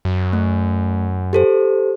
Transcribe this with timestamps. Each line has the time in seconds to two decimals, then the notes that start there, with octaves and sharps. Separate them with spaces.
0.05 F#2
0.33 A3
1.33 G4 A4 C5